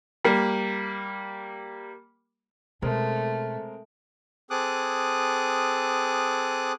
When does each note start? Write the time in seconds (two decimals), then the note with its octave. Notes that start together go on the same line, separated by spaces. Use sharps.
0.25 G3 A#3
2.82 B2 G#3 A3 C4 A#4
4.50 C4 G#4 A4 D6 D#6 F#6